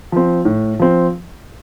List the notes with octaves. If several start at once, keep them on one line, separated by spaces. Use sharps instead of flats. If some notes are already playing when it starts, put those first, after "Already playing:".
F3 C4
A2
F3 C4